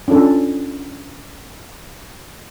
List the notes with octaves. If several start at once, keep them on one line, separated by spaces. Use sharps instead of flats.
C#4 D4 F4 A4